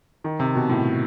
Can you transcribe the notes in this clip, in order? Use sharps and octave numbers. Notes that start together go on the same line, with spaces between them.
D#3
C3
B2
A2